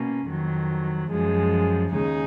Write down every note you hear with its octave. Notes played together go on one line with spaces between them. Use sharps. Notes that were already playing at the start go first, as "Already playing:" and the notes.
Already playing: B2 A#3 C#4
F2 D#3 F#3
F#2 F3 G#3
D#2 C#3 G#3 D#4 G#4